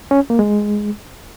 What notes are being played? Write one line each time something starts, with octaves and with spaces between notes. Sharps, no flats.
C#4
A#3
G#3